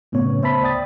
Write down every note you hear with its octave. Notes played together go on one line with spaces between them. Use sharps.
F#2 A2 C#3 B3 C#5
C5 E5 A5 B5
D2 D5 G5 D#6 A6